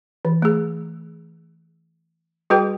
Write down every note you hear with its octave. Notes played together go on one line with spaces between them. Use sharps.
E3
A3 G#4
G3 F#4 G#4 B4 G5